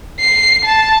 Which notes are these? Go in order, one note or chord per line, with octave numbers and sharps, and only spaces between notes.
C7
A5